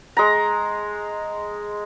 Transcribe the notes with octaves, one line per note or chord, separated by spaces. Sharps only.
G#3 A#5